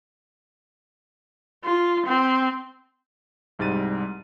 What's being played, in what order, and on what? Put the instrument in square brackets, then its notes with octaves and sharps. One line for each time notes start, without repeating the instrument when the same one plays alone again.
[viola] F4
C4
[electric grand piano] C2 G#2 G3 A6 D#7